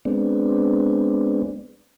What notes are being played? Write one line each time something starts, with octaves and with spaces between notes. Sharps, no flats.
G#3 B3 C4 D4